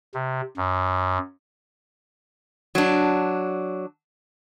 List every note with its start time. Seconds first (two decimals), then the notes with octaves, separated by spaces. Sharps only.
0.15 C3
0.57 F#2
2.75 F#3 D4